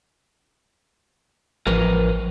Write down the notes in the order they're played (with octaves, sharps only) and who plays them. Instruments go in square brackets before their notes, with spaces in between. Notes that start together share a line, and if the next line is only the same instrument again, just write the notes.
[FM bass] A1 [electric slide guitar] F3 A#4 B4